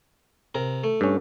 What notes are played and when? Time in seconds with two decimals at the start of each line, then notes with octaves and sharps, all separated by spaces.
0.55 C3 A#4
0.84 A3
1.01 G2 C#4